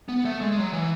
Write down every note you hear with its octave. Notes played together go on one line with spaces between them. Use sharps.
B3
A3
G#3
G#3
F#3
E3